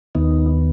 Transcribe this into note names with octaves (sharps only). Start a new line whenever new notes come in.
D#2 D#3 B3 D#4